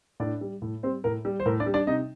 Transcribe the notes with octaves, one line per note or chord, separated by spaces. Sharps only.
A2 D4 D5
G3
A2
G3 C4 C5
A2 A#4
G3
C5
A2 A#4
D4 D5
G3
D4 D5
C3 D#4 D#5